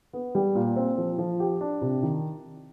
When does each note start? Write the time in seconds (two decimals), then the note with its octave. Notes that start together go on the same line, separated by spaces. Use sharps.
0.13 B3
0.35 G3
0.55 A#2
0.76 C4
0.98 F3
1.18 F3
1.40 G4
1.61 D4
1.82 C3
2.03 D#3